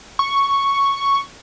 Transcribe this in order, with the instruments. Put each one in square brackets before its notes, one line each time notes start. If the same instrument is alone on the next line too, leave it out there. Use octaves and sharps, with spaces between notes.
[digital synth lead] C#6